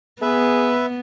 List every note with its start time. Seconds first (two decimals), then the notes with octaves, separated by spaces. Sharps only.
0.22 B3 G#4 B4 E5